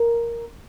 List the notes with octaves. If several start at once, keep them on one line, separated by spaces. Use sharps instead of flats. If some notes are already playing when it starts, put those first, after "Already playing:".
Already playing: A#4